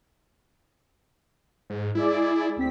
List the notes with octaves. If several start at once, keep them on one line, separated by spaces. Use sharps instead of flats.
G#2
G#3 E4 G#4 D5
D2 C4 B6